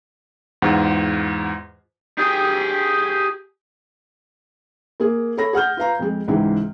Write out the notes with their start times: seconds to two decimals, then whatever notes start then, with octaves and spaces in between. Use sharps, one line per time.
0.62 E2 G#2 F4 F#5
2.18 G4 G#4
5.00 A#3 G#4
5.37 A4 C#5 B5 A#6
5.53 G#4 F#5 F6 G6
5.77 F4 B4 F5 A#5
5.99 F2 G#3
6.28 C#2 G#2 E3 G#3